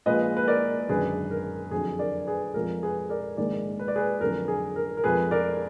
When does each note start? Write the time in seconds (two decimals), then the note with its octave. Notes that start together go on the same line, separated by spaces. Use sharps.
0.06 A#1 A#2 F3 G#3 B4 D#5
0.37 B4
0.47 A#4 D5
0.89 G#1 F#2 D3 F#3 G#4 B4
1.31 A#4
1.71 F2 D3 F#3 G#4
1.99 A#4 D5
2.27 G#4 B4
2.54 F2 F3 G#3 A#4
2.83 G#4 B4
3.10 A#4 D5
3.37 A#1 G#2 D#3 G#3 A#4 D5
3.79 B4
3.88 D5
3.96 G#4 B4
4.21 F2 D3 F#3 A#4
4.48 G#4
4.76 A#4
4.97 A#4
5.04 F2 F3 G#3 G#4 B4
5.31 A#4 D5